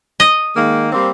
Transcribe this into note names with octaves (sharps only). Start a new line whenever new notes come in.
D#5
D#3 G#3 A#3
G3 A#3 C4